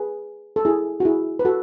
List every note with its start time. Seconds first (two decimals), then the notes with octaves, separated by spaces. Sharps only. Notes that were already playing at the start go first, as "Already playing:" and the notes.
Already playing: G#4 B4
0.56 A4
0.65 E4 G#4
1.00 F#4
1.05 E4 G#4
1.39 B4
1.45 F#4 A4